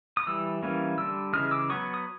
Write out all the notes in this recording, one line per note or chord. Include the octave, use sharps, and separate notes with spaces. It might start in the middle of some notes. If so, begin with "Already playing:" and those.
D#6
E3 G3 E6
E3 G3 A#3 C#4
D3 G3 E6
C#3 E3 G#3 D#6 F6
D6 E6
F#3 B3 C#6 D#6
D#6